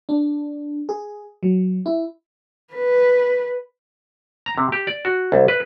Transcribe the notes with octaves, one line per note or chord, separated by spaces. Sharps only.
D4
G#4
F#3
E4
B4
A#5
C3
G4
D5
F#4
C2
B4